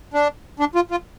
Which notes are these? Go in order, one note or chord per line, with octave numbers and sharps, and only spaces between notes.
D4
D4
F4
F4